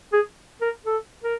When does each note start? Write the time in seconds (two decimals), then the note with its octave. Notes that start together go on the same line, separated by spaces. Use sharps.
0.13 G#4
0.62 A#4
0.86 A4
1.24 A#4